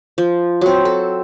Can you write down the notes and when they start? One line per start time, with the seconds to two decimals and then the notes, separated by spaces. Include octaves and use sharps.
0.18 F3
0.61 F#3 C4
0.85 A4